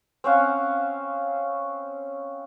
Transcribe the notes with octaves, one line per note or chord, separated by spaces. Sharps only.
C4 C#4 F5 F#5